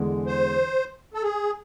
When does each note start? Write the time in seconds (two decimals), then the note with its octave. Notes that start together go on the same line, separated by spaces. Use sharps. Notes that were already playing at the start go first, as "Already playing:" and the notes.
Already playing: E2 D3 G#3
0.27 C5
1.14 A4
1.22 G#4